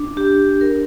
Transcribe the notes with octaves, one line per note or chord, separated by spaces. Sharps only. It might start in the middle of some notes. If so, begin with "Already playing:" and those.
Already playing: D4
G4
A#4